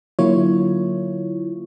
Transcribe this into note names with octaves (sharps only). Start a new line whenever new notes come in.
D3 F#3 A#3 E4 F4 C#5